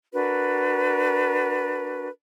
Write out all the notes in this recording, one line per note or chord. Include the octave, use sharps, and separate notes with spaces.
D4 F#4 A#4 B4